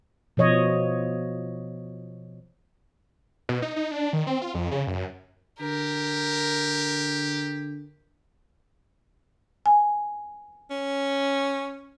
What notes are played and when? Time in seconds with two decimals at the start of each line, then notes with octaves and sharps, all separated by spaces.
0.37 B2 F3 C#5 D#5
3.49 B2
3.62 D#4
3.76 D#4
3.91 D4
4.13 D#3
4.27 C4
4.42 F4
4.54 F2
4.71 C#3
4.87 F#2
5.61 D3 G4 A#4
9.66 G#5
10.70 C#4